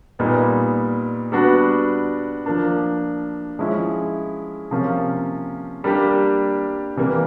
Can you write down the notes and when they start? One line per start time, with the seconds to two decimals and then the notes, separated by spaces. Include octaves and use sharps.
0.19 A#2 G3 B3 D#4
1.32 G3 B3 D4 F#4
2.46 F3 A#3 D4
3.59 F3 G#3 C#4 E4
4.71 C3 F3 A#3 C#4 F4
5.84 G3 A#3 D4 G4
6.97 C3 E3 G3 A#3